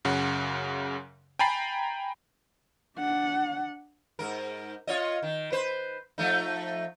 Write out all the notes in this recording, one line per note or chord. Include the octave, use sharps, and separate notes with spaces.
F#2 C#3 F#5
G5 G#5 A#5 B5 A6 C7
D4 F#5
G#2 A#4
F4 C#5 D#5
D#3
B4 C5
F3 A3 D#4